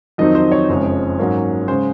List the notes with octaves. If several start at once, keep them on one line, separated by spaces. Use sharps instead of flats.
F2 D#3 F#3 C4 D#4 D#5
C5
C#5
F#1 F2 C#3 G#3
G#2 F#3 A#3 C#4
C#3 G#3 C5